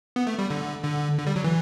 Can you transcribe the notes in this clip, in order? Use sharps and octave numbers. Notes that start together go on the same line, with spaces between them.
B3
A3
G3
D3
D3
D3
G3
F#3
E3